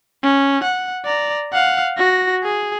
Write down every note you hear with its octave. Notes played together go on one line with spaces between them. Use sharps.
C#4
F#5
D5 A#5
F5 F#5
F#4 A#6
G#4